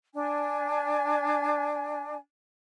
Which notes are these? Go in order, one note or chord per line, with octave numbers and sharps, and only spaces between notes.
D4 G#5